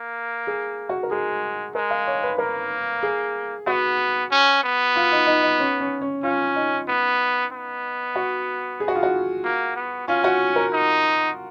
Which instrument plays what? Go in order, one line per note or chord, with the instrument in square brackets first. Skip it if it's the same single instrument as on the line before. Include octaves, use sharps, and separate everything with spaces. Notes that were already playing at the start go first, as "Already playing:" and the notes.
Already playing: [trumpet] A#3
[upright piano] G#4
F#4
A#4
[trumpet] G#3 [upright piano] G#4
[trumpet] G#3 [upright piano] A#4
[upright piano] F5
C#5
B4
[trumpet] A#3 [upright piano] A#4
[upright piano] G#4
[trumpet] B3 [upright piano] F#4
[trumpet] C#4
B3
[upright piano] F4
D#4
D#4
D#4
C#4
C#4
C#4
[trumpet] C#4 [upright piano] F4
[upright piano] D#4
[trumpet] B3
B3
[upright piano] F#4
G#4
F#4
F4
F#4
[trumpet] A#3
B3
[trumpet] C#4 [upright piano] F4
[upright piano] F#4
A#4
[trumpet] D#4